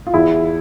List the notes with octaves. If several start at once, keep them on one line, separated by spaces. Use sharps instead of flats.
F4
E2 E4